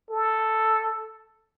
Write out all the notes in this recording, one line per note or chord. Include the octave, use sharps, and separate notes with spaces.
A4